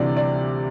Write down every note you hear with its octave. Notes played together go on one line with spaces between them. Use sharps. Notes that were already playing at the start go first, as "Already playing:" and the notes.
Already playing: D2 C3 E3 G3 D5
D5